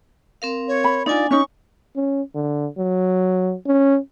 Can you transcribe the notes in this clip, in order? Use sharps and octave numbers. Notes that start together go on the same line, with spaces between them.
C4 A#4 F5
C#5
B5
D4 D#4 F4 D5 G#5
C#4 D#4 C#6
C#4
D3
F#3
C#4